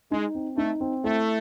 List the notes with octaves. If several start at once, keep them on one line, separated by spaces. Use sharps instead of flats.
G#3 D#4
C4
A3 D#4
C4
A3 E4